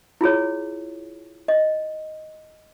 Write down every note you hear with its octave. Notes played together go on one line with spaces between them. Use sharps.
E4 F4 G#4 C#5
D#5